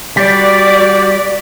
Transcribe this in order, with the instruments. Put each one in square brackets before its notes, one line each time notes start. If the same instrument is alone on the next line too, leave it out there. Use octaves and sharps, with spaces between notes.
[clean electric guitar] G3 [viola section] F#4 D5 [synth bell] B6